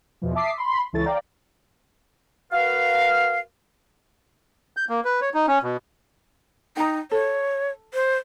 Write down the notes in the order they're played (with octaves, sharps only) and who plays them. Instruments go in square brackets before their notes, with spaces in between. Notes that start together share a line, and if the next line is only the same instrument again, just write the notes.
[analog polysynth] E2 B2 E3 F3
E5 A5 D6 D#6 B6 C7
B5 C6
C#2 E3 E4 A4 C#5 A6
D5 F5 G5 A#5
[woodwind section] F#4 A#4 B4 F5
[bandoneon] G6
A#3
B4
C#5
D#4
C#4
B2
[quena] D#4 [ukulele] G5 A#5
[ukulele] A4 [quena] C#5
[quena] C5